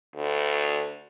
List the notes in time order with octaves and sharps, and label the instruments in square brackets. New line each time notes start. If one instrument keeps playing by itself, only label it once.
[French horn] D2